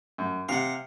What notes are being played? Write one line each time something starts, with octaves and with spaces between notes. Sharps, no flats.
F#2
C3 F5 F#5